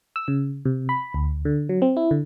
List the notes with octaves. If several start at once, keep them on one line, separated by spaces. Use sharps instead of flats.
E6
C#3
C3
B5
D2
D3
F#3
C4
E4
D3